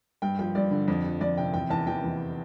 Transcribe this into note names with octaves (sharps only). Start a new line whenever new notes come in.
G2 G5
F3 G5
G2 D5
D3
F2
F3
F2 D5
C3 G5
E2 G5
E2 A5
E3 G5
E3